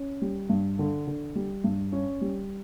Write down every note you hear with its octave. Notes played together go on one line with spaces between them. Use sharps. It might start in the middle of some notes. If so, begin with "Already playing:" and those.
Already playing: C#4
G3
G2
D3
D3
G3
G2
C#4
G3